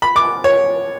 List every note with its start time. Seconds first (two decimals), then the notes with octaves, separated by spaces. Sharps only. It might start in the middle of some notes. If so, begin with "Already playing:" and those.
0.02 B5
0.16 D6
0.44 C#5